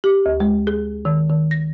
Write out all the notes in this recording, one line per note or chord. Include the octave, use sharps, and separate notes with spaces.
G4
D2
G#3
G#4
D#3
D#3
A#6